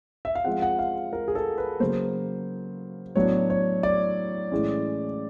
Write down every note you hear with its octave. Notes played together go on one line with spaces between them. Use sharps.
E5
F5
F3 G#3 C4 F#5
F#5
F5
A#4
G#4
A4
B4
C#3 F#3 A#3 C5
A2 F#3 B3 D4 C#5
C#5
D5
A2 E3 G#3 C#4